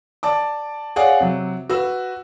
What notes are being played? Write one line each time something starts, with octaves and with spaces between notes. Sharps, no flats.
D5 A5 D6
G#4 C#5 D5 F5 F#5
C3 F#3
F#4 B4 E6